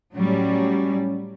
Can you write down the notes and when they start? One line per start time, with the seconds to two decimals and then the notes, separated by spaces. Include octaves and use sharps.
0.16 A2 F#3 G3 C#4